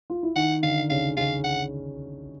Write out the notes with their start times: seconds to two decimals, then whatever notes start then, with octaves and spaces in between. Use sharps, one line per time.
0.10 F4
0.23 E4
0.36 D#3 D#4 F#5
0.63 D3 D4 F5
0.90 C#3 C#4 F5
1.17 C#3 C#4 F5
1.44 F#5